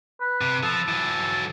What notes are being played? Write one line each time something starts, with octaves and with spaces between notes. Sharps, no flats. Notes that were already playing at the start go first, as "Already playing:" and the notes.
B4
C3
F3 A4
E3 F#3